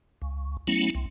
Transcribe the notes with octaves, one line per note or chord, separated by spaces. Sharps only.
C#2
F#3 A3 B3 C#4 E4
C2